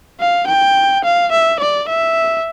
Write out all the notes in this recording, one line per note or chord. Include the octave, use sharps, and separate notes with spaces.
F5
G5
F5
E5
D5
E5